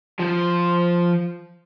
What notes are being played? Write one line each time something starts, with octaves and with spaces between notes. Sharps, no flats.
F3 C5